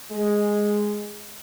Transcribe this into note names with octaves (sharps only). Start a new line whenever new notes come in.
G#3